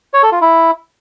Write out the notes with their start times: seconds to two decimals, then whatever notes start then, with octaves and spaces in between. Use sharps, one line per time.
0.13 C#5
0.23 A4
0.32 F4
0.41 E4